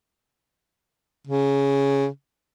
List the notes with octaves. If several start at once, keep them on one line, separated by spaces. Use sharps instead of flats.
C#3